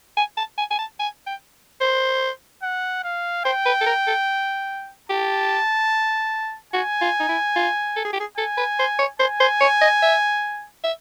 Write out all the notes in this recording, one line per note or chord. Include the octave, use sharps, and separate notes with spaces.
G#5
A5
G#5
G#5
A5
G#5
G5
C5
F#5
F5
C5 G5
B4
A4
A#4
A4
G4 A5
F#4 G#5
F4
D#4
E4
F4
A4
G#4
G4
G#4
A4 G#5
B4
C5
C#5
C5 G#5
C5
C#5
D#5
E5
E5